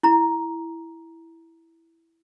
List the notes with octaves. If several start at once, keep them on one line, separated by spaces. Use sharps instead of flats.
E4 A#5